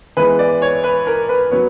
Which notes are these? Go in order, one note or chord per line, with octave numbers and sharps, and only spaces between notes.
E3 G#3 B3 B4
D5
C#5
B4
A#4
B4
F#3 B3 C#5